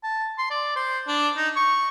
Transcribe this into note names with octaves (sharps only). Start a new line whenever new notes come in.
A5
C6
D5
C5
D4
D#4
C#6